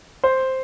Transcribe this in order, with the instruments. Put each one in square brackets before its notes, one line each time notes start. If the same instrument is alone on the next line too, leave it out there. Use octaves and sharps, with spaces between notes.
[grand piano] C5